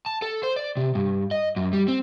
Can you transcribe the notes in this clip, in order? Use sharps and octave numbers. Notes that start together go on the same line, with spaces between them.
A5
A4
C5
D5
C3
G2
D#5
F#2
G3
C4